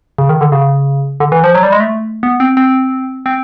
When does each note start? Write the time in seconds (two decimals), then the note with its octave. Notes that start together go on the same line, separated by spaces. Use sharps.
0.18 C#3
0.29 D#3
0.41 D3
0.52 C#3
1.20 D3
1.32 E3
1.44 F3
1.55 F#3
1.63 G3
1.72 G#3
1.80 A3
2.23 B3
2.40 C4
2.57 C4
3.26 C4